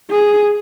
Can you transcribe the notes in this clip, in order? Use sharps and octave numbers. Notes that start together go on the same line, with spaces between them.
G#4